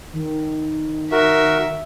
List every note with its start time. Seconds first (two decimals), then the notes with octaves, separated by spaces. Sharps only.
0.13 D#3
1.12 F#4 A#4 E5